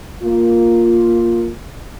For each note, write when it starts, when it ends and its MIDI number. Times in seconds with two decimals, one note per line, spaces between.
0.23 1.51 58
0.23 1.51 65